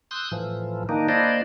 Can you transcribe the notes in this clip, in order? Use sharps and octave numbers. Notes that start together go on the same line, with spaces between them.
C6 D#6 E6 F#6 G6
A2 E3 F3
D#3 A#3 D4 D#4
A#3 D4 E4 C5 D5 D#5